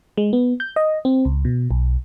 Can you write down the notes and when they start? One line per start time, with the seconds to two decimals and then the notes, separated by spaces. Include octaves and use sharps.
0.18 G#3
0.33 B3
0.60 G6
0.76 D#5
1.05 C4
1.25 C#2
1.45 B2
1.71 B1